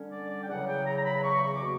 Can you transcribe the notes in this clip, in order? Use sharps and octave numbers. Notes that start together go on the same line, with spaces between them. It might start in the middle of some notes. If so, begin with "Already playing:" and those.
Already playing: D3 G3 C#4
D5
D5
G5
E2 C#3 F#3 F#5
G5
A#5
A#5
B5
C#6
C#6
D6
B2 A#3